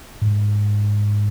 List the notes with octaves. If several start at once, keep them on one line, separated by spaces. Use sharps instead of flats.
G#2